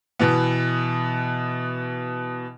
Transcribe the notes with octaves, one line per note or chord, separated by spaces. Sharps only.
B2 E3 B3